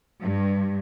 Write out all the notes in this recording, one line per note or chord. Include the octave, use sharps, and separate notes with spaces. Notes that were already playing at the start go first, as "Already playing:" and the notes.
G2